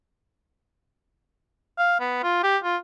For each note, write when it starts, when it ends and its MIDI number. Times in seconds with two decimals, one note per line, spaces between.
1.78 1.97 77
2.00 2.22 59
2.23 2.43 65
2.43 2.57 67
2.63 2.77 65